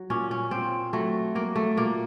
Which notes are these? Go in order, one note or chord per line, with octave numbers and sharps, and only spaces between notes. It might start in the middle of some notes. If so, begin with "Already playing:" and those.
Already playing: F#3
A#2 C#4
C#4
A#2 C4
F#3 A3
F#3 A#3
A3
A#2 A#3